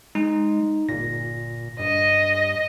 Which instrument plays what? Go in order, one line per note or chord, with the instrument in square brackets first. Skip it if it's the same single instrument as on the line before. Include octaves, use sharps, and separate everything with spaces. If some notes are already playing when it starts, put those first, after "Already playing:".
[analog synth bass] G#3 [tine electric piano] D#4
[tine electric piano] G1 A#6 [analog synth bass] A#2
[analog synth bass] G2 [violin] D#5